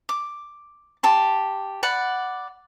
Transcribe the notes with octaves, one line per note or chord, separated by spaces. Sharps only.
D6
G4 A5 C6
D5 F#5 B5